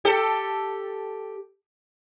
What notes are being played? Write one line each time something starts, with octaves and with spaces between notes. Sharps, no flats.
G4 A4